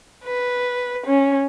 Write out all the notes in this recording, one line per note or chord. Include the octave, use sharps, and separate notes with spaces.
B4
C#4